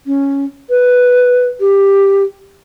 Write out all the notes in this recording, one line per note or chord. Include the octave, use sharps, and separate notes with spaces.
C#4
B4
G4